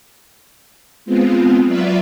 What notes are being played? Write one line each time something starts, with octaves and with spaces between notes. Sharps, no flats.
G#3 B3 C4 F4
F#3 F4 B4 D5 E5